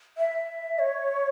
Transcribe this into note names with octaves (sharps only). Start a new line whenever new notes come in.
E5
C#5